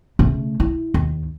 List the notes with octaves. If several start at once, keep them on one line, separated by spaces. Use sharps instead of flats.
C#3 A3
E4
D#2